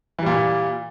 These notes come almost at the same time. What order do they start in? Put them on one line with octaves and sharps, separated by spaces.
E3 G3 A#2